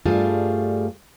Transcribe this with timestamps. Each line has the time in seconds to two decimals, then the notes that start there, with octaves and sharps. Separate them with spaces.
0.06 G2 G3 A3 F4 G#4